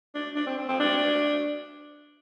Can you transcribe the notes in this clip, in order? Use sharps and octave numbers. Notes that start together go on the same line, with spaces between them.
D4
D4
C4
C4
C4
D4